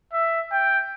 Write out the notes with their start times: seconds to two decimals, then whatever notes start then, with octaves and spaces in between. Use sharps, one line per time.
0.13 E5
0.52 G5